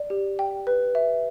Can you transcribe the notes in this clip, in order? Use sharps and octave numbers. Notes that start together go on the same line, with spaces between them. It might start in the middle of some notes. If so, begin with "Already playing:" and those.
Already playing: D5
G4
G5
B4
E5